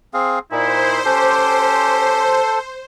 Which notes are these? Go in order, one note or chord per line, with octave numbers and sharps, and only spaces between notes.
C4 G#4 F5
A#2 D#4 E4 C5
C#4 G4 A4